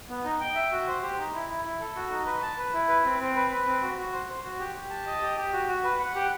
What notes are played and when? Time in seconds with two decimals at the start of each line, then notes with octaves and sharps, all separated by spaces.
0.10 B3
0.25 D#4
0.41 G5
0.55 E5
0.72 F#4
0.87 C5
1.02 G4
1.18 D#4
1.34 E4
1.49 E4
1.65 E4
1.80 A4
1.96 F#4
2.11 D#4
2.26 B4
2.42 A5
2.58 B4
2.73 E4
2.88 B4
3.05 C4
3.20 C4
3.36 B4
3.51 B4
3.66 C4
3.82 F#4
3.98 F#4
4.13 C5
4.29 C5
4.44 F#4
4.60 G4
4.75 G4
4.90 A5
5.06 D#5
5.22 G4
5.37 G4
5.53 F#4
5.69 F#4
5.84 B4
6.00 F#5
6.15 G4